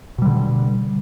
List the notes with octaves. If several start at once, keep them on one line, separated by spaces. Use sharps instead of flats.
B2 D3 G3